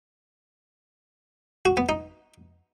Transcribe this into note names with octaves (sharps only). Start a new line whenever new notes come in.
F#4
B3
D#4